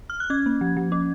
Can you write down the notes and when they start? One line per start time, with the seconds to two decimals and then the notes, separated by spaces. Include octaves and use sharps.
0.10 F6
0.20 F#6
0.30 C#4 G#6
0.46 A#3
0.61 F3
0.77 F3
0.92 C#4